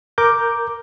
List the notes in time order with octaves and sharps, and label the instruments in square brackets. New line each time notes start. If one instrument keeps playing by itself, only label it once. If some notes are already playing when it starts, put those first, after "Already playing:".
[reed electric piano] A#4 D6 G6